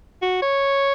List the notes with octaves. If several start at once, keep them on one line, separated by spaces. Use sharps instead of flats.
F#4
C#5